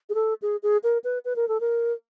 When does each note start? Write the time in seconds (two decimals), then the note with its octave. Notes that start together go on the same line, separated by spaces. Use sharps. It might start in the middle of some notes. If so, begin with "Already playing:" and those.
0.09 G#4
0.15 A4
0.42 G#4
0.63 G#4
0.84 A#4
1.04 B4
1.25 B4
1.36 A#4
1.48 A4
1.60 A#4